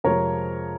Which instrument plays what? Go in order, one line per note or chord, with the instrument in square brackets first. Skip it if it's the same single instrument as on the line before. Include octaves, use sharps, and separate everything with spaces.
[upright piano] F2 C3 F3 G#3 A#4 C#5